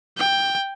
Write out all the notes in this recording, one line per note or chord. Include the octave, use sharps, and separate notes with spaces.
G5